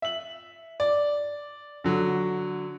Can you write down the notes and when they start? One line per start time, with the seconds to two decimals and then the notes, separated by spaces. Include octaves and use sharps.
0.02 E5 F#7
0.80 D5
1.84 D3 F#3